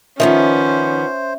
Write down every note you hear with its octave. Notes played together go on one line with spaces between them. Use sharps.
D#3 F3 B3 C#4 C5 E5